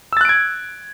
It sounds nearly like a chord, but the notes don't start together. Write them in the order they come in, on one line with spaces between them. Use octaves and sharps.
E6 A6 F#6 D7 G#6